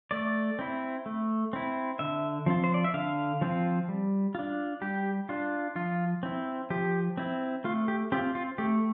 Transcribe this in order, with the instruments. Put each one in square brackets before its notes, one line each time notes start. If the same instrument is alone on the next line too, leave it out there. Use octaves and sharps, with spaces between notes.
[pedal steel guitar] A3 D5
C4 E4
A3
C4 E4
D3 E5
F3 C4 F4
C5
D5
E5
D3 F5
F3 C4 F4
G3
D4 F4
G3 G4
D4 F4
F3 F4
C4 E4
F3 G4
C4 E4
A3 F4
G4
C4 F4 G4
F4
A3 G4